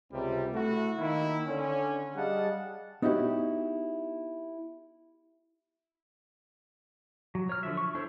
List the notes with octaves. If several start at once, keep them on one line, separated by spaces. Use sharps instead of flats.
C#2 C3 G3
A3 E4 F#4
D#3 A#3 E4
D3 C#4
G3 G#4 D#5 F5 F#5 A5
B3 D#4 E4 F#4 G4 C#5
F#3
C#5 F6
D3 F3 E5
C#6
D4 E4 A4 C5 C#5